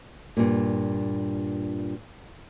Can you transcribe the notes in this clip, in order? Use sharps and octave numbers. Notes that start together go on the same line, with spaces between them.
G2 A#2